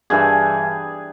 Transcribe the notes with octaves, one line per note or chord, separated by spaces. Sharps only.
G2 E3 G#4